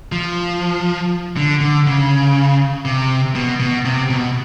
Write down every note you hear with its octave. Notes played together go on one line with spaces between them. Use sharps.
F3
D3
D3
C#3
C3
B2
B2
C3
B2